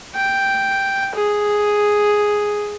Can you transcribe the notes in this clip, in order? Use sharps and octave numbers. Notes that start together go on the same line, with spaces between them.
G5
G#4